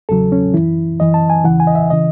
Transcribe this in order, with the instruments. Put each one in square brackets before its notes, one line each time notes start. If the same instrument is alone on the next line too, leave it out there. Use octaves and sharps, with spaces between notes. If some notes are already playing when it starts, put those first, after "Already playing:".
[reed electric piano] E2 C#3 F#3 A4
C#4
F#2 E3 E4
F#2 E3 D#5
A5
G#5
E2 C#3 E3 F#5
G#5
D#5
E5
C#3 E3 D#5